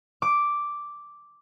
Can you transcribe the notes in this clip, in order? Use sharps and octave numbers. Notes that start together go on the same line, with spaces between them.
D6